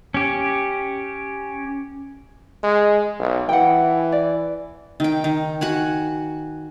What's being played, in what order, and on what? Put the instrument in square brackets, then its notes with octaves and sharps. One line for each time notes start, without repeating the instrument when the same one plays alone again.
[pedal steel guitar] C#4 G4
[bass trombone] G#3
B1
[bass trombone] E3 [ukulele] F#5 G5
[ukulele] D5
[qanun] D#3 G5
D#3
F#4 F#5 G#5